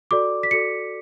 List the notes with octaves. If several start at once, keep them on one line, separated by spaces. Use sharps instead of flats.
F#4 A4 D5 D6
B6
F#4 A4 D5 C#7